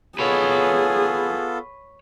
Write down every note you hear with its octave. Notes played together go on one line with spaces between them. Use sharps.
B3 F4 G#4 A4 B4 C#5